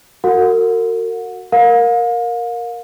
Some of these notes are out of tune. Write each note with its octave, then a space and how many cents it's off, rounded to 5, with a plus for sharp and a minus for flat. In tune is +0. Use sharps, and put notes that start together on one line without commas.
F#4 +0 A#4 -40 F#5 -30
A#4 +0 F5 +35